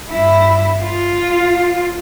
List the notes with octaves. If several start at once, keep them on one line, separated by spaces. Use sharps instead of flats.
G2 E4
F4